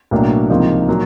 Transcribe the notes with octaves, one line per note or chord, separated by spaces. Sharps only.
B1 A2 F#3 A#3 D4
C#2 C3 F3 A#3 D#4
A#2 F#3 A#3